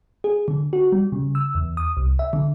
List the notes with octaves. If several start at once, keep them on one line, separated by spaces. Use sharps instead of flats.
G#4
D3
F#4
G3
C#3
E6
E2
D#6
C2
E5
D3